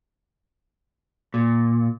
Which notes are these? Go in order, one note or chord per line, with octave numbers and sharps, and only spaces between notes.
A#2